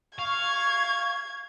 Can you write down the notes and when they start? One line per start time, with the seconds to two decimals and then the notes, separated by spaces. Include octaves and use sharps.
0.19 F5 C#6 G#6